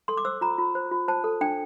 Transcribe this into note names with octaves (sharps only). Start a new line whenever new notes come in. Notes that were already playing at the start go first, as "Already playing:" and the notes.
A4 C6
D6
C5 E6
F4 A#5
F4
C5
F4
C5 A5
A4
D4 G5